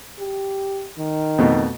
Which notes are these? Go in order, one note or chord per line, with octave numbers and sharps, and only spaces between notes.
G4
D#3
F2 B2 A3